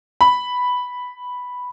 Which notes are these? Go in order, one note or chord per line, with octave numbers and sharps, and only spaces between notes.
B5